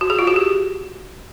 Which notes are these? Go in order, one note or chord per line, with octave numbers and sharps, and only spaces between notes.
F#4
G#4
F4
F#4
G4